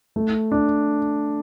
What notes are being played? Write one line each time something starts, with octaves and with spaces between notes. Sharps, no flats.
A3
D4